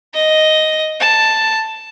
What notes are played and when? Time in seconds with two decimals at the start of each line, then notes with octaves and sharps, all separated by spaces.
0.14 D#5
1.00 A5